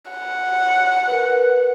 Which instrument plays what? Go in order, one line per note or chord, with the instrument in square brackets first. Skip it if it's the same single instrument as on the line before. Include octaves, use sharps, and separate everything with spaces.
[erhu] F#5
[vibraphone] A#4 B4